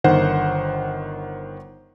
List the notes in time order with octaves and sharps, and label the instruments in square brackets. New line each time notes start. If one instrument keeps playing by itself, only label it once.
[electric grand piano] G1 D#3 C5 F#5